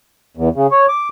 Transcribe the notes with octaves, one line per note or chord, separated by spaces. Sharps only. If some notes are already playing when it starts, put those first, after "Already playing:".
E2
C#3
C#5
D6